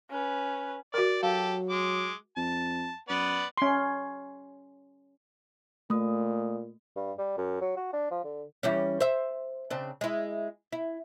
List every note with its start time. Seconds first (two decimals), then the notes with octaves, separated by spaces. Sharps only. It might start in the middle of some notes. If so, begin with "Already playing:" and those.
0.10 C#4 B4
0.94 F#4 A#4 D5
1.23 F#3 G4 A4 F5
1.70 G#3 D6
2.37 F2 A5
3.09 F#2 B3 B4 D5
3.57 C#4 C6
5.90 A#2 A3 D#6
6.96 G2
7.18 G3
7.37 F#2
7.61 F#3
7.76 F#4
7.93 D4
8.11 F3
8.24 D3
8.63 E3 G3 C#4
9.00 C5 E5
9.70 C#3 C4 D4
10.01 G#3 E4
10.72 E4